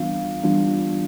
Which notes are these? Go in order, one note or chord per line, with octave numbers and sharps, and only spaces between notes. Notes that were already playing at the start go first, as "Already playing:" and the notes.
Already playing: E3 G3 B3 D4 F4 F5
E3 G3 B3 D4 F4